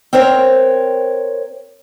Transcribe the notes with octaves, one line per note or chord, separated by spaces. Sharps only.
C4 A#4 C5 C#5